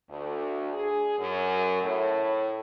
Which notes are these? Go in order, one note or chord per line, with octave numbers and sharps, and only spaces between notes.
D2
G#4
F#2
A2